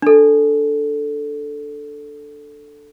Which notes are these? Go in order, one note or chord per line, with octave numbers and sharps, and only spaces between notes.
D4 A4